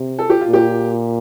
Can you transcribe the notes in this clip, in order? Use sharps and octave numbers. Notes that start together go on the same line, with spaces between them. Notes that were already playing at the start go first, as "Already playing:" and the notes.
Already playing: C3
A4
G4
F4
A#2 G4